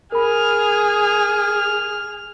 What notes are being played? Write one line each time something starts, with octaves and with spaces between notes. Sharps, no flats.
G#4 A#4 B5 F6